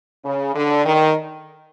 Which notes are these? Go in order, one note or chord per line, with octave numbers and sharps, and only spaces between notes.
C#3
D3
D#3